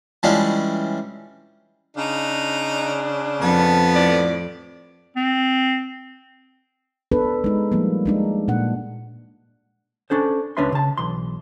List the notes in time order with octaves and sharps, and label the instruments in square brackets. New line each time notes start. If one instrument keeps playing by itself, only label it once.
[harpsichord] E3 G3 G#3 C#4 D4 F4
[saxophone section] C#3 D4 [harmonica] D#4
[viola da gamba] F2 [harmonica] B3 A5
[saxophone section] A2 D5
[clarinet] C4
[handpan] B3 D4 A4 B4
G#3 D#4
F3 G3 A#3
G#3 D4 D#4
A#2 D4 F#5
[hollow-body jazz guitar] C#4 D4 A4 C5
C#2 C#4 D4 B4 E5 C6
C#3 A5
B1 E3 C6